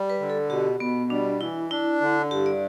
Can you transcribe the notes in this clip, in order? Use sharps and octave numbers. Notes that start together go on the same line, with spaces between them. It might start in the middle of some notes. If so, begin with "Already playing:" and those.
Already playing: G3
B4
D3
A4
B2 G4
B2 B3
G3 D4
E3 E4
D4 E4
D3
G2 G4
D5